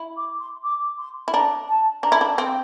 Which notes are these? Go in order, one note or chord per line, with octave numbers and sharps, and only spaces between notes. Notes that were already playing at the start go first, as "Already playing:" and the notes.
Already playing: E4
D6
C6
D6
C6
E4
D4 A#5
A5
D4 A#5
E4
D4
C4 C6